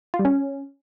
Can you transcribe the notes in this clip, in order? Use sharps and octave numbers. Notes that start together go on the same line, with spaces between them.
F4
G3
C#4